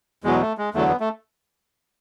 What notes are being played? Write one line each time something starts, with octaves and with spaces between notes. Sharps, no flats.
E2 B2 F#3 G#3
A3
G#3
E2 D3 F#3 A3
B3
A3